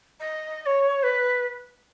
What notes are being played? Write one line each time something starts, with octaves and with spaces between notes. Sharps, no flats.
D#5
D#5
C#5
B4